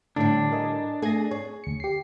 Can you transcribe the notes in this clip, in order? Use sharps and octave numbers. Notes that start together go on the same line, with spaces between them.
A2 D3 G3 D4
A#4 D#5 G#5
A3 G#4 G#5 A#6
G#4 C#5
D2 C#7
G4 C7